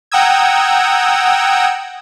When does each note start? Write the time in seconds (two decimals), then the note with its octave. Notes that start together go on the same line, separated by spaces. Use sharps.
0.12 F#5 G5 A#5 D#6 E6 G#6